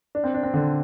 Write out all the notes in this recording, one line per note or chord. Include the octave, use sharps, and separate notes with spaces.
D4
C4
D4
C4
D3